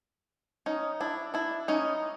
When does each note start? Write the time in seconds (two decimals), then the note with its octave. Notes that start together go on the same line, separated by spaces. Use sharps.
0.66 C#4 D#4
1.00 D4 E4
1.34 D4 E4
1.68 C#4 D#4